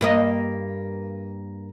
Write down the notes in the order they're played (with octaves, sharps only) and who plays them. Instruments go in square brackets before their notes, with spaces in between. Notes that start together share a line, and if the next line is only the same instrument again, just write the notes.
[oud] G2 A#3 D#5